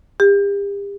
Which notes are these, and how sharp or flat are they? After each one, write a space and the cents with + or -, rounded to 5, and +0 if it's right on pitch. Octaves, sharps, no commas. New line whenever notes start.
G4 +40